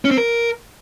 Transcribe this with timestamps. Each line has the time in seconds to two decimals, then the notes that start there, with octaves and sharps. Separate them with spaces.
0.05 C#4
0.11 C4
0.17 A#4